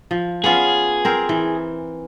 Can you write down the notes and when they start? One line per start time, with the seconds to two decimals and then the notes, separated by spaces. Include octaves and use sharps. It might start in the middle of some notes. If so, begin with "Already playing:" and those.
0.11 F3
0.44 B3 C#4 F4 G#4
1.05 C4 A#4 C5
1.29 E3